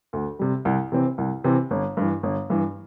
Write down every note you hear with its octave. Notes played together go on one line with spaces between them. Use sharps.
D2
C3 G3
C2
C3 E3 C4
C2
C3 E3 C4
G1
G2 E3
G1
G2 E3